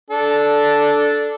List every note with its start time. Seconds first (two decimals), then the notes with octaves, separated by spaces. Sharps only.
0.10 D4 A4